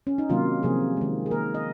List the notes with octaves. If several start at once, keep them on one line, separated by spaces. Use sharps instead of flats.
C#4
D#4
C3 D#3 F#3 A#3 F4
C3 F3 A#3 G#4
D#3 G#3
G#4
D#3 A#3 A#4
D#5